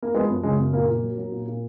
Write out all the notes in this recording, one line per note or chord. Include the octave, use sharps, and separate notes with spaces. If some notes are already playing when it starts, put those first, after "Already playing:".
A#3
F3 G#3 B3
F#2
C#3 G#3
F#2
A#2 A#3
A#2
F#3
F#3
A#2
A#2